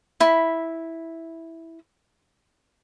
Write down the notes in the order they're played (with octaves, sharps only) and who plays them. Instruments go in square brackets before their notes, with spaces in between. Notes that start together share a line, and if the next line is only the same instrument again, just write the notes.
[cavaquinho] E4 B5